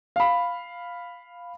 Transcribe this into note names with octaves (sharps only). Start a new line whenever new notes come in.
F5 B5